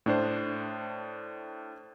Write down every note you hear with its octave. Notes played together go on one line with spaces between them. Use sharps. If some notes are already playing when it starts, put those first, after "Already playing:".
A2 D4 C5